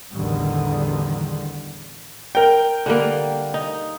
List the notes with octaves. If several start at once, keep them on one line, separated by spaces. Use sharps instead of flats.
A1 E2 D3 D#3 G3
A#4 G5
D3 G3 A#3
D#4